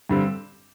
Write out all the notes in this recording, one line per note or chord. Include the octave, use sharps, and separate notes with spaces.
G2 D3 G3 C4